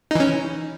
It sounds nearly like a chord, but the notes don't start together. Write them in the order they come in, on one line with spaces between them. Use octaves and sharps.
D#4 E3 C#4